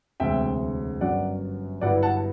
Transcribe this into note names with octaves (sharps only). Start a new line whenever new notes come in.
E1 D2 C3 E5 G5
G1 F#2 F#3 D5 F#5
G1 G2 F#3 B3 E4 D5 F#5
F#5 A5